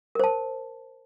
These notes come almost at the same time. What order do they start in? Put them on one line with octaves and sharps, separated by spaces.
A#4 C5 A5